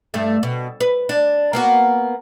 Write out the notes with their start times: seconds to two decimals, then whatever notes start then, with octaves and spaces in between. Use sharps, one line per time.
0.14 G2 A3
0.43 B2
0.80 B4
1.09 D4
1.53 A#3 B3 F#4